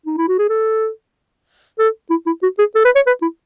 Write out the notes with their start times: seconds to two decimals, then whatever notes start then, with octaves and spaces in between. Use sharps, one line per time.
0.06 D#4
0.18 E4
0.28 F#4
0.39 G#4
0.49 A4
1.79 A4
2.10 E4
2.26 E4
2.43 F#4
2.59 G#4
2.75 A4
2.85 B4
2.96 C#5
3.07 B4
3.22 E4